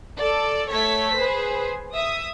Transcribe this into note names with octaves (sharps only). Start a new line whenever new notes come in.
A4 D5
A3 A4 C#5 B6
G#4 B4 C5
E5 D#6